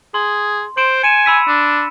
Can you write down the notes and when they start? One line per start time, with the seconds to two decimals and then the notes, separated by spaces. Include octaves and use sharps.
0.14 G#4 C6
0.77 C5 C6 D7 E7
1.03 G#5 C#7 D#7 E7
1.26 B5 E6 B6
1.48 D4